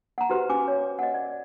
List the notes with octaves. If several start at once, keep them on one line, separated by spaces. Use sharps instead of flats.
F#5 A#5
F#4 G4 B4 C5
C#4 G#5 D6
C#5
D#5 F#5
D5